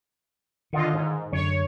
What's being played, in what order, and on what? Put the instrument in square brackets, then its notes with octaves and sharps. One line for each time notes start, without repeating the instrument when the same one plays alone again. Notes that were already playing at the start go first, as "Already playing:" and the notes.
[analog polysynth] D3 F4 D#5 [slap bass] D#3
[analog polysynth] G#2
[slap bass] F#2 D3 [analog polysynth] C#5